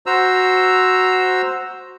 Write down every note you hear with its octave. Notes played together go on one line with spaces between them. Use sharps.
F#4 C5 A#5 E6